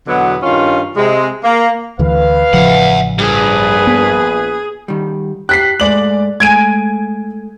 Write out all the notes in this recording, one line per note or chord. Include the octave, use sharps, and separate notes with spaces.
E2 B2 D3 F#3 B3
G2 D#3 C#4 F4
C3 G#3
A#3
D2 D3 E3 B4 F5
A1 C#3 F3 E5 F#5
A#1 G2 G#4 B4
B3
D#3 G3
G4 F#6 B6 C7
G#2 G#3 A3 D5 F#7
G#3 A3 G#5 G#6 D7 D#7